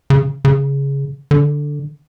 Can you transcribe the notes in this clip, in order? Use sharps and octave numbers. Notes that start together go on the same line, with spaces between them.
C#3
C#3
D3